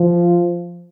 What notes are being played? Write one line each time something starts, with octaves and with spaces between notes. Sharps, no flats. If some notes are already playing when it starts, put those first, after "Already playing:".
Already playing: F3